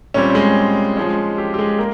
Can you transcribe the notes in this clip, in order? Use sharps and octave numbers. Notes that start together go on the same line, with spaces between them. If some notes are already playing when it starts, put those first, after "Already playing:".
A#2 G3 C4 C#4 C#5
G#3 G#4
F3 G#3 C#4
G4
G4
G#3 G#4
A#3 A#4